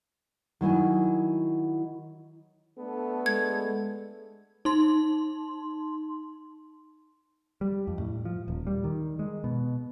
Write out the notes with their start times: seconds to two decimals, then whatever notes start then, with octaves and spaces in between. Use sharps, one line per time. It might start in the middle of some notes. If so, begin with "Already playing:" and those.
0.61 D#3 F#3 E4 G#5
2.78 A3 B3 D4 A4
3.26 G#3 G#6
4.65 D#4 C6
7.61 G3
7.87 F2
7.99 A2
8.25 F3
8.48 D#1
8.67 G3
8.84 D#3
9.19 G#3
9.44 B2